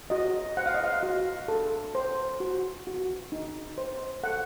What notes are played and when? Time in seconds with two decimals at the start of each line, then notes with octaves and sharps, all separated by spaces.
0.10 F#4 D#5
0.57 C5 F#5
0.66 F5
0.75 D#5
0.84 F5
1.03 F#4
1.48 A4
1.95 C5
2.40 F#4
2.87 F#4
3.32 D#4
3.78 C5
4.23 A4 F#5